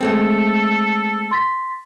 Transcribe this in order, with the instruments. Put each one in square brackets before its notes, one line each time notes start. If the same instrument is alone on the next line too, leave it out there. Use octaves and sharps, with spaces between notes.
[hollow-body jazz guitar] G#3 A3 C4 [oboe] A4
[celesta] C6 A6 B6